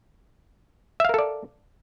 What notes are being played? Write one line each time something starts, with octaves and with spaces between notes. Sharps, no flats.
A4 A#4 D5 E5 F5